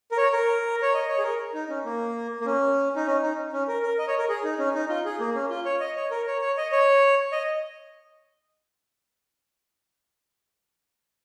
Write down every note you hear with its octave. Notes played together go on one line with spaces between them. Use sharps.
A#4
C#5
A#4
C#5
D#5
C#5
G#4
A#4
D#4
C#4
A#3
A#3
C#4
D#4
C#4
D#4
C#4
A#4
A#4
D#5
C#5
A#4
G#4
D#4
C#4
D#4
F4
G#4
A#3
C#4
F4
C#5
D#5
C#5
A#4
C#5
C#5
D#5
C#5
D#5